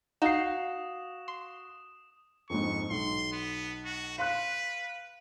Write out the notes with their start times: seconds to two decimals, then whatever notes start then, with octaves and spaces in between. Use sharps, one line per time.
0.22 D#4 F#4 F5 D#6 C7 E7
1.28 C6
2.50 F2 G#2 C#6
2.90 B1 C6
3.32 B3
3.85 F#4
4.18 B4 F5 C6 F#6